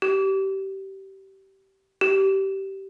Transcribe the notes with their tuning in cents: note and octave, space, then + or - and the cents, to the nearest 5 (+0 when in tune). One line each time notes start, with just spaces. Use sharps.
G4 -25
G4 -20